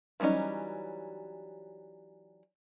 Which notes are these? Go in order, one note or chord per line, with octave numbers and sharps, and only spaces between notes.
E3 F#3 G3 C#4 D#4